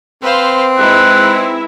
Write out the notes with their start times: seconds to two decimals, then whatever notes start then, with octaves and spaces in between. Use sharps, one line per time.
0.23 C4 B4 C5 F5
0.78 G#3 D#4 E4 B4 E5 F#6